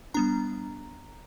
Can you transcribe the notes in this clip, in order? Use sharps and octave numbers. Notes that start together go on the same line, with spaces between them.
G3 B3 D4 A#5